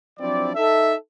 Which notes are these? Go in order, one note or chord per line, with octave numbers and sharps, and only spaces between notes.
F3 F#3 C4 D4 E4 D5
D#4 A4 E5